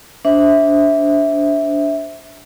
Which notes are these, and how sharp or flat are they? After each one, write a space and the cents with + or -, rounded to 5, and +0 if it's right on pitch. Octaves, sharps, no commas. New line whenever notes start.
D4 -15 C5 +0 E5 -10